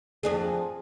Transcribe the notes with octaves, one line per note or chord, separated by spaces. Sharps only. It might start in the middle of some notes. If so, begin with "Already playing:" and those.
F2 D4 G#4